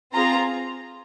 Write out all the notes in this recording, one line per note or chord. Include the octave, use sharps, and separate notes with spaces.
C4 F4 G#4 A#5